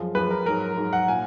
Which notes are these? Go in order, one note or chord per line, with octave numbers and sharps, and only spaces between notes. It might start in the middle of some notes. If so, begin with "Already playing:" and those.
Already playing: F#2 F3 G#3
F#2 F3 G#3 B4
A#4
G#2 F#3 A#4
G#2 F#3
F#5
A#2 G#5